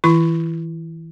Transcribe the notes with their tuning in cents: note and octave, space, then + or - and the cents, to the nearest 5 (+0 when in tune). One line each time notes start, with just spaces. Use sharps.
E3 -25 E4 +30 C#6 +0